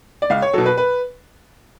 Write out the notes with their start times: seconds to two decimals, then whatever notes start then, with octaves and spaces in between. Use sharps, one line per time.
0.22 D5
0.30 C#2 F5
0.42 C#5
0.53 B2 F#3 A4
0.66 B4
0.78 B4